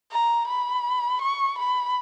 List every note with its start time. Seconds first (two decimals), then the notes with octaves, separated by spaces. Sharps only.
0.12 A#5
0.48 B5
1.22 C#6
1.59 B5